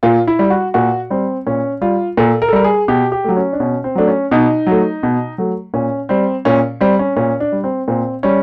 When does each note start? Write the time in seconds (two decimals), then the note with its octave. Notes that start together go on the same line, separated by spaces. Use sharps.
0.03 A#2 F4
0.27 E4
0.39 G3
0.50 F#4
0.74 A#2 F#4
1.10 G3 C4
1.47 A#2 C#4
1.81 G3 F4
2.17 A#2 A4
2.42 A#4
2.48 A4
2.53 G3 A#4
2.64 G#4
2.88 B2 G4
3.12 G4
3.24 F#3 A3
3.36 C#4
3.53 D4
3.60 B2 C#4
3.84 C4
3.95 F#3 A3 D4
4.08 C#4
4.31 B2 D#4
4.67 F#3 A3
5.03 B2
5.38 F#3 A3
5.74 A#2 C#4
6.09 G3 C4
6.45 A#2 C#4
6.81 G3 C4
6.99 C#4
7.16 A#2 C#4
7.40 D4
7.52 G3
7.64 C4
7.88 A#2 C4
8.23 G3 C#4